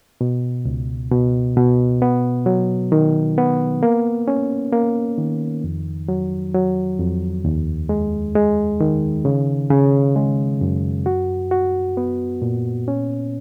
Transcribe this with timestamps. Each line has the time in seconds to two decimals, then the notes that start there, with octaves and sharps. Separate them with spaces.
0.21 B2
0.65 C#2
1.11 B2
1.57 B2
2.02 B3
2.46 F#3
2.92 D#3
3.38 B3
3.83 A#3
4.28 C#4
4.73 A#3
5.18 D#3
5.64 F2
6.08 F#3
6.54 F#3
6.99 F2
7.45 D#2
7.89 G#3
8.35 G#3
8.80 D#3
9.25 C#3
9.70 C#3
10.16 G#3
10.61 F#2
11.06 F#4
11.51 F#4
11.97 B3
12.42 A#2
12.88 C#4